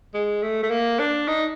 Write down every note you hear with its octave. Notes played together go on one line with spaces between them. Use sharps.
G#3
A3
A3
A#3
D4
D#4